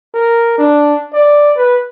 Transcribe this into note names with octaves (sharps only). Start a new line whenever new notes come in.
A#4
D4
D5
B4